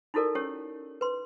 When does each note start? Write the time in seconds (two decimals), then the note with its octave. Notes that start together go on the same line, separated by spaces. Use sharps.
0.14 D#4 E4 F#4 A4 A#4 D5
0.35 C#4 G4 C#5
1.01 B4 C6